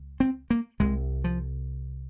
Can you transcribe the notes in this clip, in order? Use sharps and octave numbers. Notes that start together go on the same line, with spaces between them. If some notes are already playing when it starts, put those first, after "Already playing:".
Already playing: C#2
C4
A#3
C2 C3 G#3
F3